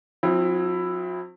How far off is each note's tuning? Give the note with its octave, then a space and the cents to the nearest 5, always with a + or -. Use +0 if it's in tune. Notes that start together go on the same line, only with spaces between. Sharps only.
F#3 -45 C4 +20 E4 +10